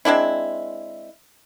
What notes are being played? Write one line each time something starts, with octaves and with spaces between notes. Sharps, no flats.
G#3 C4 D4 E4